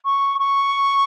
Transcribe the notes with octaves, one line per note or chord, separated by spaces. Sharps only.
C#6
C#6